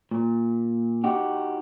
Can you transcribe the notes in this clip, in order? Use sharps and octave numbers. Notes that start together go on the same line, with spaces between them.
A#2
D#4 F#4 G4